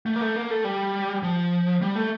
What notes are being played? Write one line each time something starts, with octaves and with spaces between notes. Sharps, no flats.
A3
A#3
A3
A#3
A3
G3
F3
G3
A3